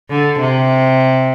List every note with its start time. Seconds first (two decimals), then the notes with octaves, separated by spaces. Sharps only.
0.10 D3
0.40 C3